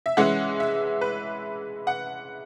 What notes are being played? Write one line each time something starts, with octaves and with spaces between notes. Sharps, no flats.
E5
E3 G#3 C#4 E4 F#5
E5
B4
F#5